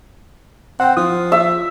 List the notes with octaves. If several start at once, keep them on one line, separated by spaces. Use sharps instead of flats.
C4 F#5 G5
F3 F4 D#6
E5